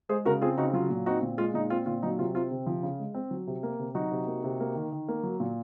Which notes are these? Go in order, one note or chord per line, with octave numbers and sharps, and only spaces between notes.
G#3 G#4 C5
C#3 F#4 A#4
C4 F4 G#4
C#3 D#4 F#4
F#3 F4
A#2
C4 D#4 F#4
A#2
G#3 F4
A#2 D#4
C4 F4
A#2 F4
F#3 D#4
C3 F4
C4 F4
C3
F3
C#3
G#3
C4
F#3
C3
A#3
C3
F#3 D#4 F#4
C3
A#3
C3
A#3
D#3
D#3
A#3
F#3
A#2